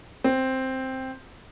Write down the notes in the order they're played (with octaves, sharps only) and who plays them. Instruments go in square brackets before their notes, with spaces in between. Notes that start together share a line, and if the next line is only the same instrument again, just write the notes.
[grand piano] C4